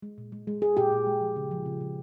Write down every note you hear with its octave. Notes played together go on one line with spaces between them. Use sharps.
G#3
A#2
G#3
G#3
G#3 G#4
A#2 G4
A#2
G#3
F3
C#3
F3
C#3
C#3